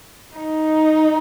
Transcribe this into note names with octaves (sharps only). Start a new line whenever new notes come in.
D#4